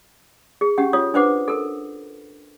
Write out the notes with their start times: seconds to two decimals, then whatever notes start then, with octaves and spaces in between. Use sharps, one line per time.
0.61 G#4
0.78 C#4 G4 F#5
0.93 F4 C#5 D#6
1.14 D4 B4 C5 F#5 D6
1.48 A4 A#4